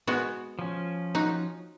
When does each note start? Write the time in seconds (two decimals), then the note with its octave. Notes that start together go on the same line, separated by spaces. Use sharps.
0.07 G#3 B3 F#4
0.59 F3 C#4
1.15 D#4 F#4